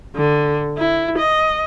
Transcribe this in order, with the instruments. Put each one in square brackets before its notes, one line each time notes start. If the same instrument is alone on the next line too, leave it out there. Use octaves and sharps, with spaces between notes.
[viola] D3
E4
D#5